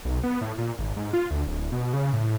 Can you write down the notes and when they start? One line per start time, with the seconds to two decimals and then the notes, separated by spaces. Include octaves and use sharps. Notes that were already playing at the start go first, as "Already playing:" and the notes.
0.05 B1
0.23 B3
0.41 A2
0.58 A#2
0.79 G#1
0.96 G#2
1.13 F4
1.31 D2
1.47 D1
1.72 B2
1.93 C#3
2.13 A2